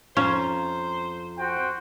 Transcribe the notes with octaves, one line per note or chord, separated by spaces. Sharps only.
F2 C#4 F4 C5 A#5
F#4 C5 G5